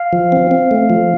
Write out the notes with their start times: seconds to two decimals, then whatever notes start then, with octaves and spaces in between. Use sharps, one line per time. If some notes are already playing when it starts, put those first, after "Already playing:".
Already playing: F5
0.13 F3
0.32 C4
0.51 C4
0.71 A3
0.90 F3